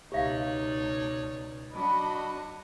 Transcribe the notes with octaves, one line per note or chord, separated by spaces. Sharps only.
C#2 B2 D#4 G4 C#5 D5 E5 F5
F#3 D4 F#4 D#5 B5